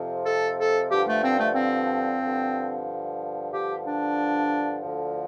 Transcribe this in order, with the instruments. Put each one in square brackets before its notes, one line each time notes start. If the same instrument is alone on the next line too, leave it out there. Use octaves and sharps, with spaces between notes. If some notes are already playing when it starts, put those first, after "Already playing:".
Already playing: [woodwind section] F2 C3 F3
A4
A4
G2 D3 F3 G4
A3
C4
A3
C4
G2 D3 F3
G2 D3 F3 G4
D4
D2 D3 F3